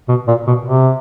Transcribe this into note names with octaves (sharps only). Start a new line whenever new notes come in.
B2
A#2
B2
C3